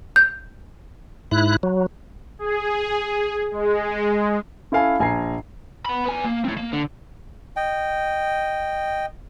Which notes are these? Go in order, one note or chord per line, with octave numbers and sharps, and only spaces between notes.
G6
G#2 E4 F#6
F#3
G#4
G#3
C#4 E4 A4 F5 G#5
A#1 G#5 A#5 C7
B3 B5
B3 G#5
A#3
A2 C4
A#3
D3
D#5 G5